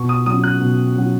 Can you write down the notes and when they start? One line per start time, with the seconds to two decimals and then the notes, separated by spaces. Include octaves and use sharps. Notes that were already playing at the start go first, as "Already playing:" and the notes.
Already playing: B2 C#6
0.09 D#6
0.26 F#3 C#4 D#6
0.44 F#6
0.61 B2
0.95 F#3 C#4